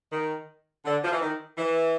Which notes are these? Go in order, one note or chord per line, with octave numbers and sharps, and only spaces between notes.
D#3
D3
F3
E3
D#3
E3